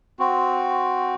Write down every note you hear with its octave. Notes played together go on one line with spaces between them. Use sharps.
C4 F#4